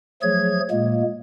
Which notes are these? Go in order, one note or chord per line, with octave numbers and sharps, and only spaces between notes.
F3 F#3 A3 G#4 C#5 G#6
A#2 G#3 A#3